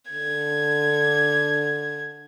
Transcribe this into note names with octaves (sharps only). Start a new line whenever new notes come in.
D3 G#6